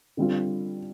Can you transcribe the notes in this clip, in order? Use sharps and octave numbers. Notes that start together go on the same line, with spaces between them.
D3 G3 C4 F4